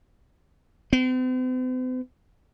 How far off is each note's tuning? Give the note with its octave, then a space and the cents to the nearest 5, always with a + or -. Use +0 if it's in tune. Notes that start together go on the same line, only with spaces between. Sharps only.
C4 -45